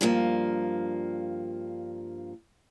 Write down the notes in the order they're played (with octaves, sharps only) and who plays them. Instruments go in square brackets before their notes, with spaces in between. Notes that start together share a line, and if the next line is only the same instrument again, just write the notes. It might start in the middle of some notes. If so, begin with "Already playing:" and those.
[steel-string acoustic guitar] G2 F3 G#3 A#3